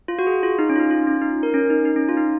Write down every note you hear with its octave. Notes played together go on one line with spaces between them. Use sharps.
F4
F#4
G#4
F4
D#4
C#4
F4
D#4
F4
C#4
D#4
A#4
C#4
D#4
D#4
C#4
F4
D#4